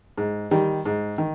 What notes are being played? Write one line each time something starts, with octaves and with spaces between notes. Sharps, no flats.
G#2
D#3 G3
G#2
D#3